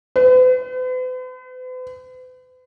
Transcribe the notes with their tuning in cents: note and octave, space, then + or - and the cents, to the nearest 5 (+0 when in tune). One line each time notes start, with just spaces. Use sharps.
B4 +45